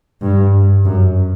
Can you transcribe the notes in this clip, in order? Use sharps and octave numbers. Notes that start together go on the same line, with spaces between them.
G2
F#2